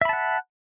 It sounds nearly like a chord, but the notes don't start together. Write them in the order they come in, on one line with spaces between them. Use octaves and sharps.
E5 B5 A5 F#5